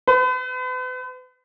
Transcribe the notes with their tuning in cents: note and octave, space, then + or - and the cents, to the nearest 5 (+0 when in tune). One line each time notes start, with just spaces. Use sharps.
B4 +40